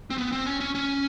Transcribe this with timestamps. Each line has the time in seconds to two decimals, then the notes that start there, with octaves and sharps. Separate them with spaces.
0.10 C4
0.18 B3
0.32 C4
0.46 C#4
0.60 C#4
0.75 C#4